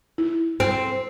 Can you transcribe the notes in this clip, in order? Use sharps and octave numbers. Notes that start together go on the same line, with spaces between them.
E4
C4